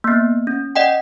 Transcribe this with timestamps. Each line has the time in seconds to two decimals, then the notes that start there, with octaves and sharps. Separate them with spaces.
0.04 A#3 B3
0.47 C#4
0.76 D5 D#5 F#5 G5